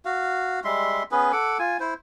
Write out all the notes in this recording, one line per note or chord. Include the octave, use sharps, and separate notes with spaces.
F#4 F5
G3 G#3 E5 C6
B3 C#4 G#4 B4
A4 F#5 D6
F4 G#5
E4 C5